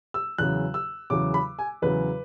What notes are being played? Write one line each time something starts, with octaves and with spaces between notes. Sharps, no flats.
E6
E2 C#3 F#3 F#6
E6
E2 C#3 F#3 D6
B5
G#5
E2 C#3 F#3 B4